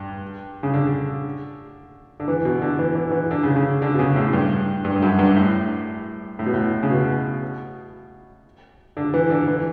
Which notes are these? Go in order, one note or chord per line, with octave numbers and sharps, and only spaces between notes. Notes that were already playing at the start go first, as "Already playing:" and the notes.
Already playing: G2
C#3
D3
D3
E3
B2
D3
E3
E3
E3
D3
C#3
C#3
D3
B2
C#3
A2
G2
G2
G2
F#2
G2
A2
A2
B2
A2
C#3
B2
D3
E3
D3
E3